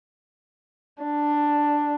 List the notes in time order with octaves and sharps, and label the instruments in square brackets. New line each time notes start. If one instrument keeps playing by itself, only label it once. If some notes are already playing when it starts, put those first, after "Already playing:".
[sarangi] D4